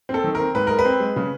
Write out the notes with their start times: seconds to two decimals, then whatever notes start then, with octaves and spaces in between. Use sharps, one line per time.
0.09 C4 A4
0.24 D#3
0.35 A#4
0.40 C4
0.55 G#2 B4
0.67 G#3 A#4
0.79 B4
0.85 C4
1.00 G#3
1.16 C#3